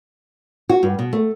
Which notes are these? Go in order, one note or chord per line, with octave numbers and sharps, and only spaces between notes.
F#4
G2
B2
A3